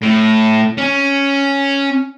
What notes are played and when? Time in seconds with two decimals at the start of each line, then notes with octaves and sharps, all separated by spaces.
0.02 A2
0.77 C#4